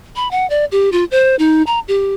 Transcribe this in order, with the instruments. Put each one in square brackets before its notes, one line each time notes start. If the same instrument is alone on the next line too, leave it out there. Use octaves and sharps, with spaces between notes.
[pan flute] B5
F#5
D5
G4
F4
C5
D#4
A#5
G4